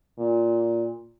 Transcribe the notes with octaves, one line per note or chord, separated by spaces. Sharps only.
A#2